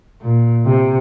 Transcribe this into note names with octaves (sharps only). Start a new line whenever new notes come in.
A#2
C3